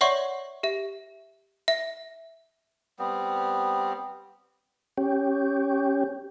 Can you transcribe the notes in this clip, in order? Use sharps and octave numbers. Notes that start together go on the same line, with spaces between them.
C#5 D5 E5 F#5 C6 C#6
G4 E5
E5
G3 B3 C4
C#4 G4